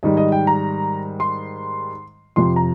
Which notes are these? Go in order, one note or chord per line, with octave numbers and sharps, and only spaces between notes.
G#2 D#3 G3 D#5
D#5
G5
A#5
C6
F2 C3 F3 C6
A#5